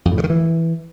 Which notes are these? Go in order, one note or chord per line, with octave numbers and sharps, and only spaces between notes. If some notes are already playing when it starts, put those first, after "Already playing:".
F2
A2
C#3
D#3
E3